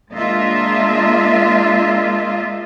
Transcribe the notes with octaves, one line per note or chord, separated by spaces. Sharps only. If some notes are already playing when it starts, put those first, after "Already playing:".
G#3 A#3 D4 F4 D#5 E5